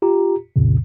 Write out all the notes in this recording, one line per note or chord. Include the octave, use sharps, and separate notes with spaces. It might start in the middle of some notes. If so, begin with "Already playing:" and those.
F4 G4 A#5
C2 F2 A#2 C#3